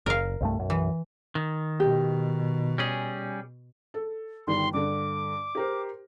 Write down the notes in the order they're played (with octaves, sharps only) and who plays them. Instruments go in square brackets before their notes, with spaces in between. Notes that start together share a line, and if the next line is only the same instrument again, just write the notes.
[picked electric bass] F#1 [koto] A#4 F5
[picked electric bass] C2 G2 A3
B1 F#2
[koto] E3
[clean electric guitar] D#3
[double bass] B2 [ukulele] G4
[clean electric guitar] G3 C#4 G#4
[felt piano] A4
[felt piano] G1 D#3 G3 [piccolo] C6
[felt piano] G2 D3 [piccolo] D6
[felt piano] G4 A#4 C5